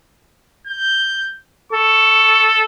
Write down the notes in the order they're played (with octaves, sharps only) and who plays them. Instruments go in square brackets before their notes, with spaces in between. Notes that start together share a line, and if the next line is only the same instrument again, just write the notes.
[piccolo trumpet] G6
[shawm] A4 [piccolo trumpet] C#6